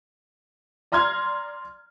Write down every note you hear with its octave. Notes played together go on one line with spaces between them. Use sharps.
D5 A#5 C6 F6 G#6